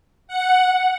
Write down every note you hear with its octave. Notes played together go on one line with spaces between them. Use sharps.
F#5